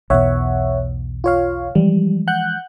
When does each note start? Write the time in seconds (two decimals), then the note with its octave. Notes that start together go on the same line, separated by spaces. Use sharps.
0.10 B1 E2 B2 C#5 E5 F#5
1.24 F4 C#5 F5
1.75 E3 F3 G3 G#3
2.28 F#5 F#6 G6